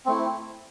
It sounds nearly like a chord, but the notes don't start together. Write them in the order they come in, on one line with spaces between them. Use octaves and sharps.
C4 A3 E4